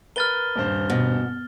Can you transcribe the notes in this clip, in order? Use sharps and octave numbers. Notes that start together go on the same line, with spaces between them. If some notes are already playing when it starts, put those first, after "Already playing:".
A#4 B4 F6 A6 G7
D#1 G2 C5
B2